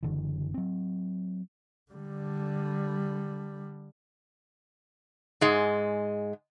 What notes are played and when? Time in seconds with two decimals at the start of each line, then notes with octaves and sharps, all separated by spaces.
0.03 F#1 D3 E3
0.54 F#3 C4
1.92 D3 G3
5.41 G#2 G#3